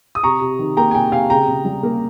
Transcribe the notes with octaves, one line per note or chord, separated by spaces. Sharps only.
D#6
C3 A#5 C#6
C3
D#3
A#3 G5 A#5
G#5
C3 G5
C3 F5 G#5
C#3 G5 A#5
C#3
G3
A#3